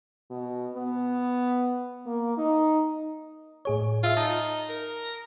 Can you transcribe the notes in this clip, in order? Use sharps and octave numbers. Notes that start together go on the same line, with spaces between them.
B2
B3
A#3
D#4
A2 G#4 C#5
F4 G#4 E5
D#4 A5 D#6
A#4